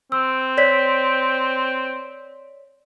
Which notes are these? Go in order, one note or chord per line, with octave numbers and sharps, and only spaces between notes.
C4 E6
C#5 D5 B6